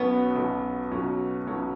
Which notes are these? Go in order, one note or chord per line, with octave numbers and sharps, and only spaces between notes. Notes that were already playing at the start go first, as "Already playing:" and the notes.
Already playing: B1 B2 F#3 B3 C#4
B1 B2 F#3 C#4
B1 B2 F#3 C#4
B1 B2 F#3 C#4